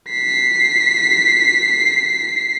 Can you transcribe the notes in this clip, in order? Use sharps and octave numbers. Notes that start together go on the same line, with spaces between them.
B6 C7